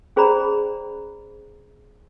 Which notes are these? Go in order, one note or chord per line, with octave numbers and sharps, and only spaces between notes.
C#4 G#4 C5 D5 A#5 B5